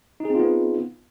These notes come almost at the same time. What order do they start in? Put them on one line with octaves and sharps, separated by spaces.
D#4 G#4 C4 F4 B3